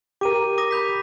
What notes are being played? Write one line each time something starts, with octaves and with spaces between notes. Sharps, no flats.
G4 A#4 D6 D#7
D6 D#6 A#6
B5 G6 B6